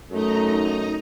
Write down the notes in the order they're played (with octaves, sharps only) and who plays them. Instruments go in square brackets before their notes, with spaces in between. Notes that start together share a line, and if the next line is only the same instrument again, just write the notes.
[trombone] F#2 [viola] A3 [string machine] D#4 D#5 A#5